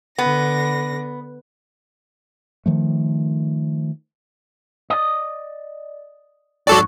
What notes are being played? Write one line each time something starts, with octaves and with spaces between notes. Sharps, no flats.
D3 B3 A#6
D#3 F3 A3
D5 D#5
F2 G#2 F#3 F#4 A4 D5